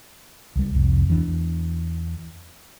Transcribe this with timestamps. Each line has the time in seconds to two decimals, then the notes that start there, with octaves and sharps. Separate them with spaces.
0.56 C#2 G3
0.75 C2 F2
1.08 E2 E3 D4